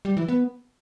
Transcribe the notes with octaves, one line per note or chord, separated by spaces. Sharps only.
G3
E3
B3